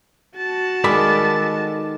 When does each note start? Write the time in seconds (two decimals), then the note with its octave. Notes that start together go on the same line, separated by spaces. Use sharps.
0.37 F#4 A5
0.84 D#3 G#3 A4 D5 B5